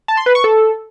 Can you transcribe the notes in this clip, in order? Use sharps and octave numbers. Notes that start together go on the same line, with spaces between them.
A5
C6
B4
C#6
A4